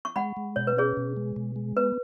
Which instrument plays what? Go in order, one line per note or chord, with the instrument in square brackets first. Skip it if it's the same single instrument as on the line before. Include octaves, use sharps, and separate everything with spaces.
[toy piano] C#6
[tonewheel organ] G#3 [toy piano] F#5 B5
[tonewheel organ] G#3
[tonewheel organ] B2 [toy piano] C#5
[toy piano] B4
[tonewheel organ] C#4 [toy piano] G#4 C#5
[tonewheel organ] B2
G#3
B2
G#3
[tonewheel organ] B3 [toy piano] B4